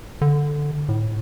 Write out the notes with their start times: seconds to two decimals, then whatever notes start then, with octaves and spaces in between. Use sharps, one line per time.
0.21 D3
0.89 A2